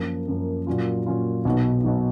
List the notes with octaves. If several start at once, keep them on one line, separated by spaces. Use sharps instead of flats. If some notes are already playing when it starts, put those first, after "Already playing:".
Already playing: F#2 F3 A#3
F#2 F3 A#3
A#2 F#3 C#4 F4
A#2 F#3 C#4 F4
B1 B2 F#3 B3 D#4
B2 F#3 B3 D#4